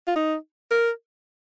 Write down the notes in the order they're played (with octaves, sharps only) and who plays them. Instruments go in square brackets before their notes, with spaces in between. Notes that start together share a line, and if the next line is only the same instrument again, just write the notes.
[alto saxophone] F4
D#4
A#4